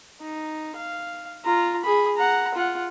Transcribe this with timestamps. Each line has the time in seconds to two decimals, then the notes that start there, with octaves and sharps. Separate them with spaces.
0.21 D#4
0.76 F5
1.45 F4 A#5
1.84 G#4 B5
2.16 F#5 A#5
2.55 F4 F#5